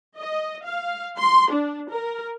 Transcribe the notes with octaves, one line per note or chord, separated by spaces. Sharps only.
D#5
F5
C6
D4
A#4